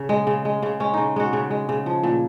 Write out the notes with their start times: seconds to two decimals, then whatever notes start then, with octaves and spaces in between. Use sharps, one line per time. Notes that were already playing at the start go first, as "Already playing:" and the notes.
Already playing: C#3
0.09 G#3
0.27 C#3
0.45 G#3
0.63 C#3
0.80 G#3 C#4
0.94 C#3 D#4
1.16 G#3 F#4
1.33 C#3
1.51 G#3
1.69 C#3
1.86 F3
2.03 A#2